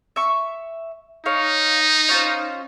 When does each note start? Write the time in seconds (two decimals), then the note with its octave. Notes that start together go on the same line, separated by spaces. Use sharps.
0.16 E5 C#6
1.26 D#4 C#5 F5
2.09 C#4 F4 C5